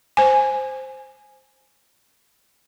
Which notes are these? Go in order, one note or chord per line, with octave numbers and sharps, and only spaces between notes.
C5 G#5